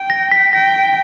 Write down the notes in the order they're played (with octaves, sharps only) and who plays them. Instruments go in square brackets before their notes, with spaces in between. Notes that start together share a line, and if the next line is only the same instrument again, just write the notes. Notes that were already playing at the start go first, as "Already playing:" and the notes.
Already playing: [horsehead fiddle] G5
[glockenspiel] A#6
B6
[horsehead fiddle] G5 [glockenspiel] A#6